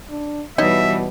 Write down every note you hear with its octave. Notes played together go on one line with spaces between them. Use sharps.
D4
B2 E3 G3 D#4 C#5 D#5 E5